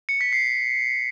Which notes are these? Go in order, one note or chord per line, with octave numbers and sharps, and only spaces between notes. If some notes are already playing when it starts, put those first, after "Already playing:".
C#7
B6
C7